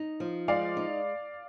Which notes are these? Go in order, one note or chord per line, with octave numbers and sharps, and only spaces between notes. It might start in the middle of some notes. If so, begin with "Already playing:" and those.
Already playing: D#4
F3
G#3 D5 F5
D#4